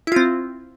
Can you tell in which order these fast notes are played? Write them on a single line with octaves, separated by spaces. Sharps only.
E4 F4 C4